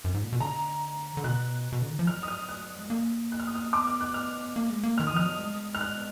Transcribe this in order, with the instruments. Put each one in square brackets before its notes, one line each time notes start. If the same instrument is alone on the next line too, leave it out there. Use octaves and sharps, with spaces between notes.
[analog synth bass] F#2
G#2
A#2
B2
[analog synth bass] D3 [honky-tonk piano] A#5
[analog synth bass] D3
[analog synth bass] B2 [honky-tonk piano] F#6
[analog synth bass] B2
D3
D#3
F3
[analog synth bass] F#3 [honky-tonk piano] F6
[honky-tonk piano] D#6
F6
F#6
[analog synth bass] G#3
A#3
[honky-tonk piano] F#6
F6
D#6
F6
[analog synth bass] B3 [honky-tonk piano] D6
[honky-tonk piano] F6
F#6
F6
[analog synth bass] A#3
G#3
A#3
[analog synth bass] D#3 [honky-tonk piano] F6
[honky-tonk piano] D#6
[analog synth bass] F3 [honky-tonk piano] F6
[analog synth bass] F#3
G#3
[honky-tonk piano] F6
F#6